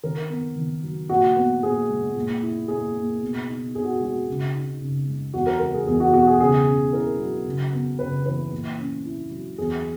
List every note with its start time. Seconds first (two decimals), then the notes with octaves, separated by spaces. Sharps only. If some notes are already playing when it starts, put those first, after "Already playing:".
0.04 D#3 A#4
0.30 B3
0.56 D#3
0.84 F#3
1.09 A#2 F#4
1.36 B3
1.63 A#2 G#4
1.89 G#3
2.15 A#2
2.42 E4
2.68 A#2 G#4
2.95 A#3
3.21 B2
3.48 D#4
3.75 B2 G#4
3.84 F#4
4.01 G#3 F#4
4.28 C#3
4.54 D#4
4.80 C#3
5.07 G#3
5.34 E2 F#4
5.46 A#4
5.60 G#3 A#4
5.74 G#4
5.87 E2 G#4
6.00 F#4
6.14 B2 F#4
6.27 G#4
6.40 C#3 G#4
6.67 C#4
6.93 E4 A#4
7.19 F#3
7.46 C#3
7.73 B3
7.99 C#3 B4
8.26 E3 B4
8.51 A#2
8.78 C#4
9.06 E4
9.31 F#3
9.58 E2 G#4